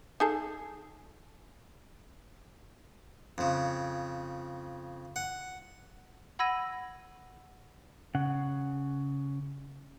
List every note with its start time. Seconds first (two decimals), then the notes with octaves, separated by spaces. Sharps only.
0.20 D#4 G#4 A4
3.38 F2 C#3
5.16 F#5
6.39 F#5 B5 E6 G#6 A#6 D#7
8.15 C#3 F#5